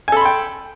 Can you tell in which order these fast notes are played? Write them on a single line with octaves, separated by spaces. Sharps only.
G#5 A4 B5 C6 G5